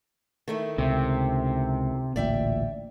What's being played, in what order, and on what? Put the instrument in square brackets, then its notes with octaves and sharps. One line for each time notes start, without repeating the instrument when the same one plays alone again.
[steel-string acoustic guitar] D#3 A3 E4
[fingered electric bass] C#2 [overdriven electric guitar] C3
[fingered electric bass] A1 D2 A#2 [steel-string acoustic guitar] D5 E5 G5